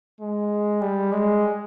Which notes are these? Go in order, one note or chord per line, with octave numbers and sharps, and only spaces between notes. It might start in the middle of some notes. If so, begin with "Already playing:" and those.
G#3
G3
G#3